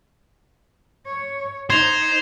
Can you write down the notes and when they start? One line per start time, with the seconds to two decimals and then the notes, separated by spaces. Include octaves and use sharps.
1.06 C#5
1.70 D#4 C5 G#6 F7